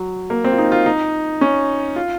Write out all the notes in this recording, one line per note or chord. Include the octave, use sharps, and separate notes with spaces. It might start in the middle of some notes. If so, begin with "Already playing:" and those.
Already playing: F#3
A#3
C4
F4
D#4
F4
D#4
C#4
F4